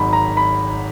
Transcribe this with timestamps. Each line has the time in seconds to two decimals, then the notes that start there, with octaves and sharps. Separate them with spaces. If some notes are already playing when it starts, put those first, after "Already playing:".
Already playing: G#1 G#2 D#3 F#3 B5
0.13 A#5
0.37 B5